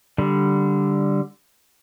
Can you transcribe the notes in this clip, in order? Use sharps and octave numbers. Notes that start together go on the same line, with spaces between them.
D3 G3